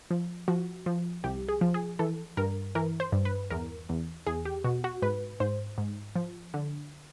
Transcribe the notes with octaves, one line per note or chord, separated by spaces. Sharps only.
F3
F3 F#4
F3
C2 G4
G#4
F3
G#4
E3 A4
G2 A#4
E3 A#4
C5
G2
B4
E2 A#4
E2
E2 G#4
G4
B2 F#4
F#4
G#2 B4
G#2 C5
G#2
F3
D3